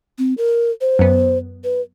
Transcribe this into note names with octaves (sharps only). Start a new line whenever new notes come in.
C4
A#4
C5
F#2 B3
B4